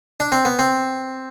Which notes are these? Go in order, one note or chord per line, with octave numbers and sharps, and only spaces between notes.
D4
C4
B3
C4